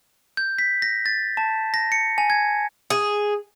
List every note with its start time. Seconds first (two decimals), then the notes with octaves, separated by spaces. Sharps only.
0.37 G6
0.58 B6
0.82 A#6
1.06 A6
1.37 A5
1.74 A#6
1.92 C#7
2.18 G#5
2.30 G#6
2.90 G#4